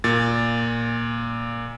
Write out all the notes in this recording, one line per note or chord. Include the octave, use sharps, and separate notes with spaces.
A#2 A6